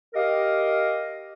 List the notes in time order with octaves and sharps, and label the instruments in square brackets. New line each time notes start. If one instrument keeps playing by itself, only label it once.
[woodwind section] G4 A#4 D#5 F5